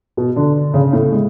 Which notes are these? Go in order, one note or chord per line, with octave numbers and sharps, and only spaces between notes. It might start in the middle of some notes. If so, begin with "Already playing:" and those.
B2 B3
D3 D4
C#3 C#4
A2 A3
G#3